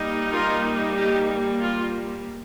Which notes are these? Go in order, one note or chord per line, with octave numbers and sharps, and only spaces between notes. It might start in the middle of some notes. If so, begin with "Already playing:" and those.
Already playing: G3 A#3 D#4
F4 A#4
D#4 G4
F4